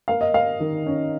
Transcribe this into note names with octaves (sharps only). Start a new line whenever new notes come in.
A#3 F5
D#5
A#3 F5
D#3
C#4